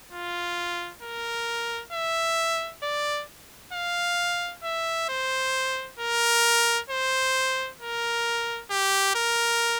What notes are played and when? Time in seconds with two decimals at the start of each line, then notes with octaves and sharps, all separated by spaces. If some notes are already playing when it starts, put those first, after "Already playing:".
0.12 F4
1.02 A#4
1.92 E5
2.83 D5
3.73 F5
4.64 E5
5.09 C5
5.99 A#4
6.90 C5
7.81 A#4
8.71 G4
9.15 A#4